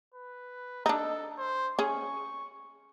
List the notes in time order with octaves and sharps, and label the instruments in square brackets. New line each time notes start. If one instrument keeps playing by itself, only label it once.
[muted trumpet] B4
[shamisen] D4 D#4 [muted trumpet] A4
[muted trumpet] C5
[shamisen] C#4 G#4 [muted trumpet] C#6